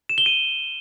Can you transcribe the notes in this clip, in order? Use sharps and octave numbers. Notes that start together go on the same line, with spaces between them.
E7
G7
D#7